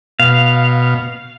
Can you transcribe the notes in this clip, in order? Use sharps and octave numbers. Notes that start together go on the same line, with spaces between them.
B2 F5